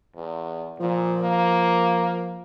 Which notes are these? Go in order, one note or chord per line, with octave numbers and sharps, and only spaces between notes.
E2
A#2 F3
A#3